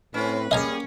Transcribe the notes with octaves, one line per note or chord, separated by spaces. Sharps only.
A2 C4 C#4 B4
G3 A#3 C#4 G#4 D#5 G#5 A#5